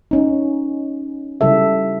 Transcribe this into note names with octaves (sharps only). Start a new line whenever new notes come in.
C#4 D#4
C#3 G3 E4 A4 E5